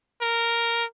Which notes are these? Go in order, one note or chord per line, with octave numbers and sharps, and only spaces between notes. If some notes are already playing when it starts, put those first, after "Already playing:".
A#4